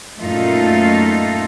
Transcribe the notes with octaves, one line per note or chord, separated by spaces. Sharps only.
F#2 A#2 A3 D#4 F4 A4